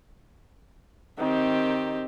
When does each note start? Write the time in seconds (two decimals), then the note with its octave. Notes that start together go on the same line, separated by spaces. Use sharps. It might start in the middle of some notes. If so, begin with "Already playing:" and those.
1.18 D#3 C4 G4